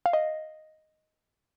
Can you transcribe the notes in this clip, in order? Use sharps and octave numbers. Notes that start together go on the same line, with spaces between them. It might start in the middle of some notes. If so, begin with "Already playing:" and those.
F5
D#5